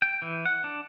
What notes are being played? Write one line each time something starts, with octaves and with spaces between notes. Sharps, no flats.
G5
E3
F#5
D4